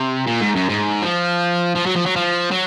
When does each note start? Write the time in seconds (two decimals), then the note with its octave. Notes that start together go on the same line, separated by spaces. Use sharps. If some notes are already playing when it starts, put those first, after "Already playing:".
Already playing: C3
0.27 A#2
0.41 G#2
0.55 F#2
0.69 G#2
1.02 F3
1.76 F3
1.86 F#3
1.96 F3
2.06 F#3
2.16 F3
2.51 F#3